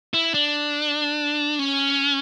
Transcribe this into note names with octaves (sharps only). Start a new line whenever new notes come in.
E4
D4
C#4